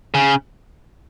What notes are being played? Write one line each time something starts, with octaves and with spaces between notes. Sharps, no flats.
C#3